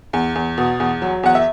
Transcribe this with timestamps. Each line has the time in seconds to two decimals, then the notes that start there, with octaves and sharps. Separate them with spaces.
0.13 E2
0.35 E2
0.58 B2
0.80 E2
1.02 F#3
1.23 E2 F#5
1.35 E5